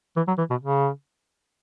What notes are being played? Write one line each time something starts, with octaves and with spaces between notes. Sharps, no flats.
E3
F#3
E3
B2
C#3